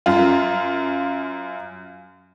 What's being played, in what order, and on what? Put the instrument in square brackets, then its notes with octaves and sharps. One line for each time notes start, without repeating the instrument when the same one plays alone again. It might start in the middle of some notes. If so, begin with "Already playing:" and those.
[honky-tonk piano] F#2 F4